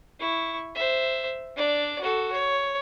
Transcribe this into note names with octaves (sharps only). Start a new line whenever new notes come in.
E4 C#6
C5 E5
D4 D5
F#4 A4
C#5